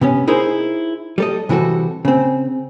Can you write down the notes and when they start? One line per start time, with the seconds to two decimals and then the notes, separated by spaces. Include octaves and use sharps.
0.01 C3 B3 C#4
0.27 D#4 E4 G#4 A#4 C5
1.18 G3 A4 D#5
1.49 C3 E3 G3 F#4 A4
2.05 C#3 C4